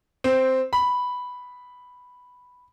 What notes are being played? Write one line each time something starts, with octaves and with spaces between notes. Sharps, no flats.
C4
B5